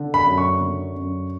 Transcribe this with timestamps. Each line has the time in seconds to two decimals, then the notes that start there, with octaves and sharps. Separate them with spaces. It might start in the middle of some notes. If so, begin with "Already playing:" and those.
Already playing: D3
0.14 B5
0.26 F#2
0.38 C#6
0.61 D3
0.96 F#2